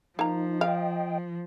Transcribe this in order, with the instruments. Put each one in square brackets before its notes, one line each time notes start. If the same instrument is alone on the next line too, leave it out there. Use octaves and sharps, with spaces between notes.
[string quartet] F3 [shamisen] A#3 A#5 [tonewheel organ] D#4
[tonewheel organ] D#5 G5 [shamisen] F5